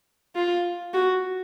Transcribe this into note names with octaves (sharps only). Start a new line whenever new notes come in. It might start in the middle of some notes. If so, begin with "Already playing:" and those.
F4
F#4